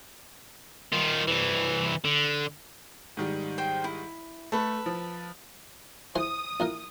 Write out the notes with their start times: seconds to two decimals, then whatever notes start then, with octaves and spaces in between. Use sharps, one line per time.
0.93 D#3 F4
1.28 C2 E3
2.04 D3
3.17 G#2 D#3 G3
3.58 C5 G5
3.84 E4
4.52 A3 A4 B4
4.86 F3
6.15 E3 G#4 C5 D#6
6.60 A#1 E3 A#4